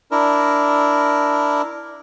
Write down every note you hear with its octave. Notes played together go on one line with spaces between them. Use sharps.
D4 E4 A#4